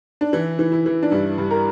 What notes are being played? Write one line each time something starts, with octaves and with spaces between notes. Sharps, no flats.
D4
E3 E4
E3
E4
E3
D4
G2 E4
G2
G4 A#4